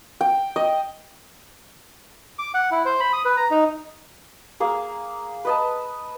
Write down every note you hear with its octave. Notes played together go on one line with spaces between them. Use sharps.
G5
D#5
D6
F#5
E4
C5
B5
D#6
B4
A#5
D#4
A#3 G#4
B4 D#5 A5